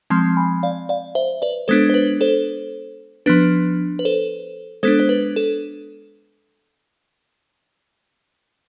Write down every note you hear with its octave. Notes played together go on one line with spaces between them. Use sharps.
F3 G#3 C4 A5 C6
G#5 B5
D5 F5
D5 F5
C5 E5
B4 D5
G#3 B3 D4 A4 C5
C5
B4
A4 C5
F3 B3 D4 B4
B4
A4 C5
G#3 B3 D4 A4 C5
C5
B4
A4